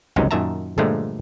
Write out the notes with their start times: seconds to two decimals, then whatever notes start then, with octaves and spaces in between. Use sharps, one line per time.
0.16 G1 C#2 F#2 C3 G#3 D#4
0.31 F#2 A#2 D#3 E5 A5 A#5
0.78 G2 A#2 D3 F3 G#3 A3